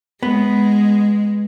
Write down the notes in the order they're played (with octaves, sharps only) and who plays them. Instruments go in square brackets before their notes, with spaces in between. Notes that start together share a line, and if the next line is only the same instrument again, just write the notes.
[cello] G#3 [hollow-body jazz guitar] B3